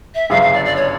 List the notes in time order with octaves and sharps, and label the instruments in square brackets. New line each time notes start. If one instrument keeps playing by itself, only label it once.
[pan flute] E5
[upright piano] G1 F#2 C#3 F#3 [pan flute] F5
[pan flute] F5
D5
D5
C#5